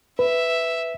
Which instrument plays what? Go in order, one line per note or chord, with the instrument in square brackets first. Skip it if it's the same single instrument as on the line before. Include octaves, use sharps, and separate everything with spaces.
[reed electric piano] B4 [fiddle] E5